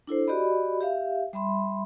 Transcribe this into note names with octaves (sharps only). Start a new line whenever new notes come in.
D4 E4 A4 C5
F#4 G4 D5 D#5 B5
G4 E5 F5
G3 E5 B5 C6